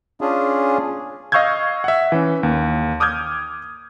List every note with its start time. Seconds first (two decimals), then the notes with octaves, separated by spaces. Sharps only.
0.21 C#4 D4 F4 G#4
1.32 D#5 F5 C#6 E6 G6 G#6
1.84 E5 F#5
2.12 E3 C#4
2.43 D#2
3.00 D6 D#6 F6 G6 G#6